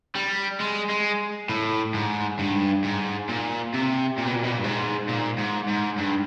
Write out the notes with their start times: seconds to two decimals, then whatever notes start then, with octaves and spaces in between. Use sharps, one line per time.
0.15 G3
0.60 G#3
0.90 G#3
1.49 A2
1.94 G#2
2.39 G2
2.84 G#2
3.29 A#2
3.74 C3
4.18 A#2
4.27 B2
4.36 A#2
4.44 B2
4.51 A#2
4.58 G2
4.64 G#2
5.08 A#2
5.38 G#2
5.68 G#2
5.98 G2